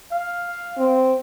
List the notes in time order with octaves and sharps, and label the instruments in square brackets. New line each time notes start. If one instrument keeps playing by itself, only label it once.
[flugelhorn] F5
[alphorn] C4